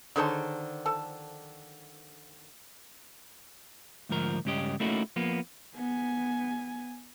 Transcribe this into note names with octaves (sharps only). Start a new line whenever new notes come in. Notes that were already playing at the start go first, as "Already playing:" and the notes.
D3 D#3 G#4 C5 C#5 A5
F3 A4 A5
D2 G#2 F3 A#4
C#2 G2 C#4 G4 D#5
A3 A#3 C#4 D#4 E4 F#4
F3 A#3 B3
B3 G#5